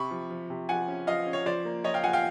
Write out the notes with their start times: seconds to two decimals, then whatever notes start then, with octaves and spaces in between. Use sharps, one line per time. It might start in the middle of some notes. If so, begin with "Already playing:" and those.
Already playing: C3 B5 C#6
0.11 F3
0.30 F3
0.50 C3
0.69 F3 F#5 G#5
0.88 C#4
1.07 F3 D#5 F5
1.27 C#4
1.33 C#5
1.46 F3 C5 D5
1.65 A#3
1.84 F3 C#5 D#5
1.94 F5 G5
2.04 F3 F#5 G#5
2.13 F5 G5